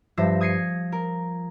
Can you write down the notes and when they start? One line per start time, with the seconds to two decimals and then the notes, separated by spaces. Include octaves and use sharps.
0.17 G2 F3 C5 E5 A#6
0.41 D#6 G#6 A#6 C7 C#7 D#7
0.92 A#4